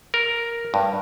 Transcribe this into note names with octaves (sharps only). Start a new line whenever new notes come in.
A#4
G2